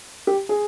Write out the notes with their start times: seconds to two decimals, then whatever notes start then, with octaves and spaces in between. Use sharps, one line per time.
0.27 G4
0.49 G#4